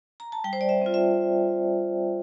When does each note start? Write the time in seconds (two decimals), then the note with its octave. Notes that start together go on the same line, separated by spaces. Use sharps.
0.20 A#5
0.32 A5
0.44 G3 G5
0.53 C5
0.61 D5
0.69 E5
0.82 C4 F4
0.94 E5